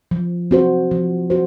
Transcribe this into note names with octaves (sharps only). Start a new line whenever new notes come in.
F3
C4 F#4 C5
F3
F#4 C5